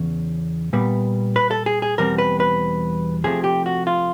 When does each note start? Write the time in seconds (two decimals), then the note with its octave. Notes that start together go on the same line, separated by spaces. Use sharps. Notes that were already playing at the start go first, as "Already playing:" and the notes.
Already playing: E2 C#3 C#4
0.73 A#2 G3 B3
1.36 B4
1.51 A4
1.66 G#4
1.82 G#4
1.98 E2 B2 G3 C4 A#4
2.18 B4
2.40 B4
3.24 C3 F3 A3 C4 G#4
3.44 G4
3.66 F#4
3.87 F4